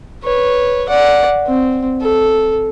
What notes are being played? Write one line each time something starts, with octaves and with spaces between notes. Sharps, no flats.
B4 C#5
D5 F#5
C4
A4